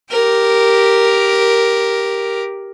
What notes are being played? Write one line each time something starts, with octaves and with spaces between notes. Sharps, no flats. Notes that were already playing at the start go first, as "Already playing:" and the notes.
G4 A#4